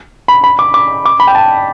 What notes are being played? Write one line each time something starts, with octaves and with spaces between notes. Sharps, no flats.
B5
B5
D6
D6
D6
B5
G5
A5